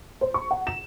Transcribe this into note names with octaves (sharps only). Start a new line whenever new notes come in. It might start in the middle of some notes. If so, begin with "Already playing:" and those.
C5
C#6
F#5
E7